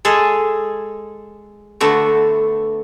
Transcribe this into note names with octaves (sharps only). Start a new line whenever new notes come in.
G#3 G#4 A4
D3 A3 B3 F#4